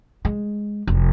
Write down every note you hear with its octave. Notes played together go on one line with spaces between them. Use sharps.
G#3
F1